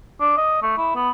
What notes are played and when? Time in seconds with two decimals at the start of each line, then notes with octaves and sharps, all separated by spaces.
0.20 D4
0.37 D#5
0.62 A3
0.77 E4
0.95 B3